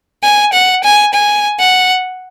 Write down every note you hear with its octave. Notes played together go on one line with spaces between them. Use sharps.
G#5
F#5
G#5
G#5
F#5